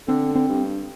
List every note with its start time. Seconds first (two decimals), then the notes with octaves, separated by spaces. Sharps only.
0.08 D3 C4
0.36 C4
0.49 G2